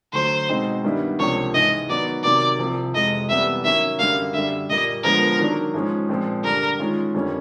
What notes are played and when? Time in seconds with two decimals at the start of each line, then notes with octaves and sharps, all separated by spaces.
0.13 D2 D3 F#3 C5
0.49 B2 G#3 C4 D#4
0.84 G2 D#3 G3 B3 E4
1.19 C#2 C3 F3 A#3 D4 C#5
1.54 G#2 E3 G#3 D#5
1.90 D#3 F#3 B3 D5
2.23 C3 D#3 F#3 A#3 D5
2.59 C2 C3 F3
2.94 F2 C3 E3 G#3 D#5
3.29 C2 C3 E3 G3 B3 E5
3.64 D#3 F#3 A#3 C#4 E5
3.99 F#2 D3 G3 A#3 F5
4.34 F#2 D3 G3 E5
4.69 A#2 G3 A#3 D#5
5.04 D3 F3 G#3 B3 A#4
5.39 D#3 F#3 A#3 D4
5.74 G#2 F3 G#3 C#4
6.09 A#2 F3 G#3 C4
6.44 G2 D3 G3 A#4
6.79 D#3 G#3 C#4 F4
7.15 F2 D3 G3 A#3 C#4